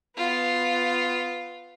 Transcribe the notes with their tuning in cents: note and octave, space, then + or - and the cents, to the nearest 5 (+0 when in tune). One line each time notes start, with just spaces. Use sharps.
B3 +20 F4 +0